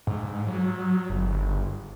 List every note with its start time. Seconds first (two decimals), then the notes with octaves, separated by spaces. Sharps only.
0.07 G#2
0.47 F#3
1.10 G1